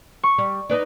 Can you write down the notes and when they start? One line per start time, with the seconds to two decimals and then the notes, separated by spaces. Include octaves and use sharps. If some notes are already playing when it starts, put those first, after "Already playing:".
0.23 C#6
0.38 G3
0.70 D#4 B4 D5